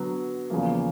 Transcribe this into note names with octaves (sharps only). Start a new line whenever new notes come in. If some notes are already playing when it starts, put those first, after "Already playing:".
Already playing: D3 F#3 B3
E2 C#3 F3 A#3